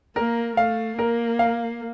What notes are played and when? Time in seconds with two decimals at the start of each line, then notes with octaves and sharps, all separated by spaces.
0.16 A#3 A#4
0.56 A3 F5
0.98 A#3 A#4
1.39 F5